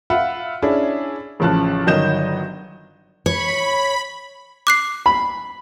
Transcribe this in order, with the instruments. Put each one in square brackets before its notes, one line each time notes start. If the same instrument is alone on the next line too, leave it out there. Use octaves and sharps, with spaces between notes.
[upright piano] F4 E5 F#5 B5
C#4 D4 E4 G#4
A1 C#3 F3 A5 F#6
G1 D#3 F#3 D#5 G6 E7
[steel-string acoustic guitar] C#5 [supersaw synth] B5
[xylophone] D6 F#6 C7
[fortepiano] B5